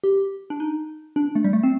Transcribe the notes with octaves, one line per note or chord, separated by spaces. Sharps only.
G4
D4
D#4
D4
A3
G3
A3
C4